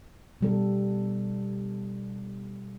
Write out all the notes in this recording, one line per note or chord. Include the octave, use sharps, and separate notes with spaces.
B2 G3 A4